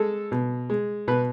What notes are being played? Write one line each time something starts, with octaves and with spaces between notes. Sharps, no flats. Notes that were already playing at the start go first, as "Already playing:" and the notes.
Already playing: G#3 A4
B2
G#3
B2 B4